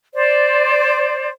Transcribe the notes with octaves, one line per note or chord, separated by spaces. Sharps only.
C5 D5